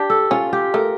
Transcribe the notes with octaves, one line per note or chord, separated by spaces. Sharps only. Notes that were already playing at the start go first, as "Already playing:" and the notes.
Already playing: D4 G4
A4
C#4 F4
G4
A3 A#4